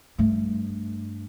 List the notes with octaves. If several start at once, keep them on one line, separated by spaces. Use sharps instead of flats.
G2 A3